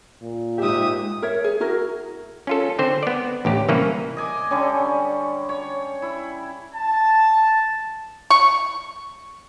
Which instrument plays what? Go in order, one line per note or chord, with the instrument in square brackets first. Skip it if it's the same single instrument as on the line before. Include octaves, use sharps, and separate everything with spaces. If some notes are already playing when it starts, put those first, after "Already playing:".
[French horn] A#2
[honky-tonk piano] G#2 G4 [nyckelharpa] E5 D#6
[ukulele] A#4 C#5 E5
G#4
E4 F#4 A#4
[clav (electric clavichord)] C#4 F4 A4
D3 C4 C5
B3 D5
A1 D2 G4
C2 E3 A#3 C#4 B4 C#5
[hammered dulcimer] D#5 G#5 D6
D3 G3 C#4
C#5
E4
[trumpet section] A5
[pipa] C#6